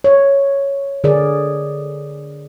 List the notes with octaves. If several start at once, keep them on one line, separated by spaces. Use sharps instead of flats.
C#5
D3 G#4 A#4 D5